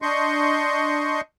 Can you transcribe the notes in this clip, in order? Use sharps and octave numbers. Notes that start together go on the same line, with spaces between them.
D4 D#5 C6 C#6 G6